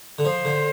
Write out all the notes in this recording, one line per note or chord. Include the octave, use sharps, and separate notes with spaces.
D3
F3 C5
D3